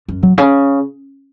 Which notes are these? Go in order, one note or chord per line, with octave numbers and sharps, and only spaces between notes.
F#2
A2 F#3
C#3